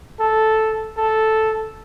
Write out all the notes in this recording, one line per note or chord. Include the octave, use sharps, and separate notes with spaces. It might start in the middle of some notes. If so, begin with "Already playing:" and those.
A4
A4